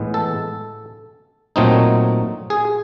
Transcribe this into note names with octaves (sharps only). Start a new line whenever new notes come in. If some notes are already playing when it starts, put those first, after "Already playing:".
Already playing: A2 E3 G#3 B3
A4
A#2 F#3 A3 C4 D#4
G#4